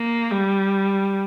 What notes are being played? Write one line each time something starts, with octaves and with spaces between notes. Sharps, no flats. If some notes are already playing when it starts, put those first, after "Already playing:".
Already playing: A#3
G3